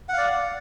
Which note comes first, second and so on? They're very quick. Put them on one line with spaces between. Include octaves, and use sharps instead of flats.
F#5 F5 D5